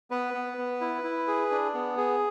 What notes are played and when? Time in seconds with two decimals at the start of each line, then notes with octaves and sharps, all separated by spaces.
0.11 B3 B4
0.34 B3
0.58 B3
0.81 E4
1.04 E4
1.27 G#4
1.51 D4
1.74 B3
1.97 G#4